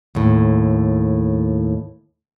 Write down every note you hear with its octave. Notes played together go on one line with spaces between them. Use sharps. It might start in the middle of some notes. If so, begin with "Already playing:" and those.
D#2 A2